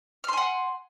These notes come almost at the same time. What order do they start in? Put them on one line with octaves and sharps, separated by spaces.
F6 C6 G#5 F#5